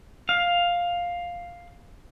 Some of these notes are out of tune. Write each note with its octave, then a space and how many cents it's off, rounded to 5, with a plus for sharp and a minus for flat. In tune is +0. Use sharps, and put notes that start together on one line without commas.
F5 +5